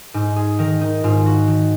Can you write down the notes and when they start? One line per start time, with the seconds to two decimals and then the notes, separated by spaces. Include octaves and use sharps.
0.14 G#2 D#4
0.36 G#4
0.59 D#3 A#4
0.81 D#4
1.03 G#2 F4
1.26 F#4
1.47 D#3